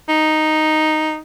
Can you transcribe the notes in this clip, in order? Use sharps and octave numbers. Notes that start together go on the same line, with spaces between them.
D#4